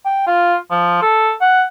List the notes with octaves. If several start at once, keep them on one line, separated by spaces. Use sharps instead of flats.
G5
F4
F3
A4
F#5